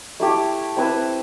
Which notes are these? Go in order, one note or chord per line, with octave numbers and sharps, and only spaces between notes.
A3 E4 G4
C4 E4 B4 E5